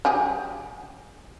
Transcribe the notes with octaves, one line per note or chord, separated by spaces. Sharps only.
F#3 G4 G#4